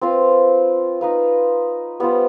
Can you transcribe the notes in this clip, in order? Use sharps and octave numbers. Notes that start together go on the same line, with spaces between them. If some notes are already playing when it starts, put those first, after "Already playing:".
C4 F4 B4 F5
D#4 B4 F5
G3 B3 F4 C5